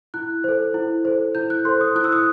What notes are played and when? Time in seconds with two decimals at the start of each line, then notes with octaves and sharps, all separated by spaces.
0.14 E4 F#6
0.44 A4 C5
0.74 E4
1.05 A4 C5
1.35 E4 G6
1.50 F#6
1.65 A4 C5 C6
1.81 D#6
1.96 E4 F#6
2.04 E6
2.12 D#6